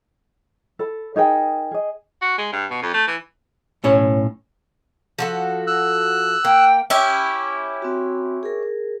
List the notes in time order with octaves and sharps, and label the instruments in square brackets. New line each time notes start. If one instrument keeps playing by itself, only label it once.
[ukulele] A4 B5
D#4 G#4 A#4 G5
G#4 D#5
[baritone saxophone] F#4
G#3
G2
B2
F2
A3
E3
[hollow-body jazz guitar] B1 A2 C#4 C#5
[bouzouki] F3 F#4 A4
[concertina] E6 F#6
[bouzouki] A#3 [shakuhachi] G5
[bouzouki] C#4 E4 G4
[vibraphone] C4 F#4
G#4 A#4